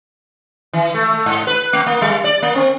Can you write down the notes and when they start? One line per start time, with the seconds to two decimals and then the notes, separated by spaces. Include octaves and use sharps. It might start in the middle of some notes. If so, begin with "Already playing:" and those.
0.73 E3
0.94 A3
1.13 A3
1.26 G#2
1.47 B4
1.73 A3
1.86 A#3
2.02 G3
2.24 D5
2.42 A#3
2.55 C4